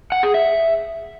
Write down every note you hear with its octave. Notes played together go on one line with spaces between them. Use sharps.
F#5
G#4
E5